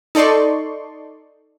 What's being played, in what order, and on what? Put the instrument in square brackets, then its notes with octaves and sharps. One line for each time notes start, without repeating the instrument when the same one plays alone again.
[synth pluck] D#4 A4 D5 C6 C#6